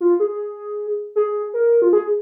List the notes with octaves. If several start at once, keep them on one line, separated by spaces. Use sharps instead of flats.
F4
G#4
G#4
A#4
F4
G#4